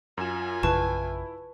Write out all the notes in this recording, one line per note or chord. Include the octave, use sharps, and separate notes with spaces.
F#2 F4 G#5 E7
A#1 F#2 C#3 E4 B4 A5 C#6